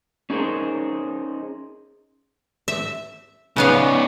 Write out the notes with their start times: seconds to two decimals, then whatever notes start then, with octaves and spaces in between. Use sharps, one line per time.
0.30 C#4 D#4 G#4 A#4 C5
2.68 E5
3.57 C#3 B3 C#4 D#4 F5